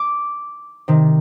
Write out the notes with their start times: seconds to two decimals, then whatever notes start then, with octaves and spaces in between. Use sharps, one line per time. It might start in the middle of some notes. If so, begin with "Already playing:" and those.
Already playing: D6
0.88 C3 D#3